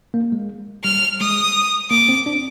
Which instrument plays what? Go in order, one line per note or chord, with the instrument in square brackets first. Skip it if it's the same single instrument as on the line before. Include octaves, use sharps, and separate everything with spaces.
[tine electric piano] A#3
G#3
[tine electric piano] G3 [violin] F6
[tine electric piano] G#3 [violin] D#6
[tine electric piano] A#3 [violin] D6
[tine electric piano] C4
D4